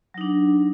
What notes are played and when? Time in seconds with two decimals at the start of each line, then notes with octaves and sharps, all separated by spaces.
0.14 F#3
0.18 D#4
0.21 D4